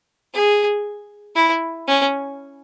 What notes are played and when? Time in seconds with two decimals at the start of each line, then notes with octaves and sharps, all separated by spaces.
0.34 G#4
1.35 E4
1.88 C#4